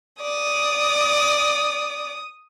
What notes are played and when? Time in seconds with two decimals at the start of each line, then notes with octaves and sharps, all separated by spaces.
0.22 D5 D#6